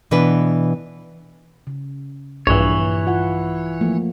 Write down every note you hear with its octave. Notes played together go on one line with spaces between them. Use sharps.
B2 E3 B3 D4 B4
C#3
A#1 G2 E3 C#5
F4 F#5
F3 A3 A#3